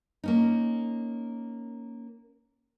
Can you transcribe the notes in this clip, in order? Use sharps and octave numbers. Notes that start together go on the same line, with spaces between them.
A#3 C#4 D#4